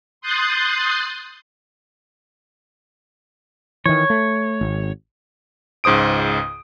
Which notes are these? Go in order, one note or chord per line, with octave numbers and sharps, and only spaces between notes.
C6 D#6 F#6 G6 A6 C7
D#3 E3 C#5
A3
G#1
C#2 G#2 C5 D#6 D7